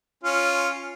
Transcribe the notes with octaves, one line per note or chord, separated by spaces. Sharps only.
C#4 F4